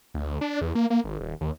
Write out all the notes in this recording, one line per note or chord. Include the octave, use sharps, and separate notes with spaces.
D2
D4
E2
A#3
A#3
G#1
D#1
D#2